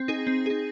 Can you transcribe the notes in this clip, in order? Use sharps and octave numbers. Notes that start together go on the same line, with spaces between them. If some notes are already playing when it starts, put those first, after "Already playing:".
Already playing: C4
D#4 G#4
C4
D#4 G#4